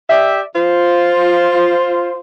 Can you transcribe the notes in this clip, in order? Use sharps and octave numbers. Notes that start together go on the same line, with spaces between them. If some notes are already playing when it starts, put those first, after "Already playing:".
G4 D5 E5
F4 C5